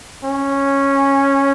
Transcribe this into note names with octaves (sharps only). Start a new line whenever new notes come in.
C#4